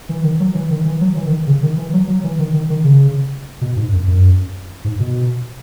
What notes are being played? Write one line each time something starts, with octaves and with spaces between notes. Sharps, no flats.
E3
D#3
F#3
E3
D#3
E3
F#3
E3
D#3
C#3
D#3
E3
F#3
F#3
E3
D#3
D#3
D#3
C#3
B2
G#2
F#2
F#2
G#2
B2